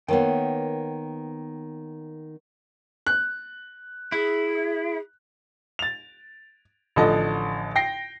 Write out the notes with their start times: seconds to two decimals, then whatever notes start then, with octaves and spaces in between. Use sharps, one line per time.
0.08 D#3 A#3 B3 C#5 G5
3.06 F#6
4.12 E4 G#4
5.79 A6 F7
6.96 A1 D3 F3 A4 D#5
7.76 G5 A#6 C7